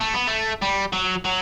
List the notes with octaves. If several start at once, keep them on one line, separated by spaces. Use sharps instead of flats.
A3
B3
A3
G3
F#3
F#3